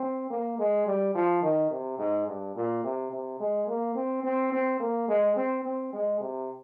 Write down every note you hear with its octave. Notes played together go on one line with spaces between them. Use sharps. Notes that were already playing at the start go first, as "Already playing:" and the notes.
Already playing: C4
A#3
G#3
G3
F3
D#3
C3
G#2
G2
A#2
C3
C3
G#3
A#3
C4
C4
C4
A#3
G#3
C4
C4
G#3
C3